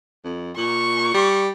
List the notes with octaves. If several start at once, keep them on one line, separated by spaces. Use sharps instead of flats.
F2
A#2 C#6
G3